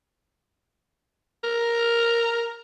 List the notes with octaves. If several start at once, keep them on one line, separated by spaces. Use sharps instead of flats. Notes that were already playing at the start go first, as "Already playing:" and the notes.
A#4